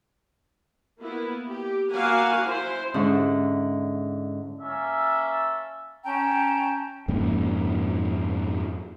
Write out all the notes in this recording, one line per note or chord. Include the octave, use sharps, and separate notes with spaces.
A#3 B3 E4
G4
A#3 F#4 F5 F#5 G#5
E4 C5 C6
G#2 D3 C#4 E4
A#3 C#4 A4 E5
C#4 G5 A5 A#5
F2 G#2 C#3 A#3